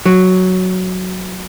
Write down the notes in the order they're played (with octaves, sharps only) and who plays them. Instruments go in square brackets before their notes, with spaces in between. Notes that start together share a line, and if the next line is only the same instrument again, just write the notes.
[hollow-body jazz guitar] F#3